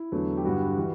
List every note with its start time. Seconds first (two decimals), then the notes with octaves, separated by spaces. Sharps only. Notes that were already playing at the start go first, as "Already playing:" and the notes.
Already playing: E4
0.12 E2 D3 F#3 A3
0.37 G4
0.44 G2 D3 G3 F#4
0.77 E3 G3